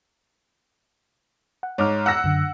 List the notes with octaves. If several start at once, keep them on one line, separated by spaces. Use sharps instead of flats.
F#5
G#2 C#5 D6 F6
F#5 E6 A#6
F#2 D3